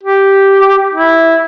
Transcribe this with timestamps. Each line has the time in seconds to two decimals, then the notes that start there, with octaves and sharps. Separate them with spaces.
0.03 G4
0.95 E4